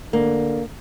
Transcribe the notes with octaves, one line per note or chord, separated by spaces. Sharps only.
D3 A#3